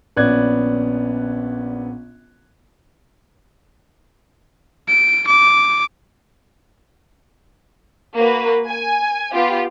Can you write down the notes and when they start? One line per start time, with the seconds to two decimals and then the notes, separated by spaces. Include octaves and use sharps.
0.16 A#1 B3 C#4 D5 F#6 G#6
4.88 D7
5.27 D6
8.14 A#3 F#4 B4
8.66 G#5
9.32 B3 F4 G4